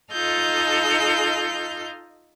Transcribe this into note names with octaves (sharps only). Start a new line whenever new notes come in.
D#4 F4 A4 D#5 F6 G6